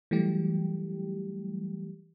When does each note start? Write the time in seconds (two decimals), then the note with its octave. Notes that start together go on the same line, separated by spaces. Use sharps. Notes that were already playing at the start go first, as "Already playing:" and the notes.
0.11 E3 F#3 G3 A3 G4